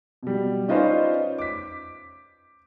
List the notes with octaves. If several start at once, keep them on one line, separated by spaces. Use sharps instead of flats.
B2 G3
C#4 D#4 F4 B4 C5 D5
D6 B6